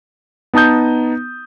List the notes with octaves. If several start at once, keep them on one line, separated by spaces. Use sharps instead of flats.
B3 D#4 A5 D#6 G6